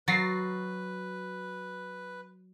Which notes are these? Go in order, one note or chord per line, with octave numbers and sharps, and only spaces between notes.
F#3 B4 A6 A#6 C7